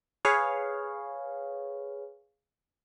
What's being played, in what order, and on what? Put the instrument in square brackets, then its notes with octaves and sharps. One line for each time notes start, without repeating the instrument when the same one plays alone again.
[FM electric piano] G#4 B4 C#5 F5